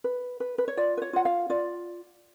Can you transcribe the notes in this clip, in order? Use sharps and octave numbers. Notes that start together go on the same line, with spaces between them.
B4
B4
B4
C#5
F4 D5
B4
C#5
F4 F#5
F5
F4 D5